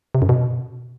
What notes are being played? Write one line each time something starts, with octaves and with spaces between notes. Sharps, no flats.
C3
F#2
B2